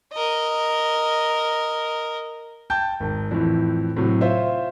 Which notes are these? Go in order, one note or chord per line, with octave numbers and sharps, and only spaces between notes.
A#4 D#5
G5 A5 G6
G#1
F2 A2 E3
A2 C3 F#3
F4 C5 C#5 E5